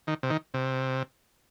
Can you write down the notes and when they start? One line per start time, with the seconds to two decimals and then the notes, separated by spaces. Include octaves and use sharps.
0.07 D#3
0.23 C3
0.30 D#3
0.54 C3